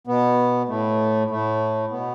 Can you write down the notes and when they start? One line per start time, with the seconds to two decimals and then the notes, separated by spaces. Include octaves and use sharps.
0.07 B2 B3
0.68 A2 A3
1.30 A2 A3
1.91 B2 B3